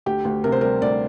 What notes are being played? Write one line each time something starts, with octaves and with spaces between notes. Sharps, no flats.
D2 G4
D2
C3 A#4
C5
G3 A#4
D2 D5